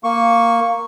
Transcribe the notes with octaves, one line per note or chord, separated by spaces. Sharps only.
A#3 C#6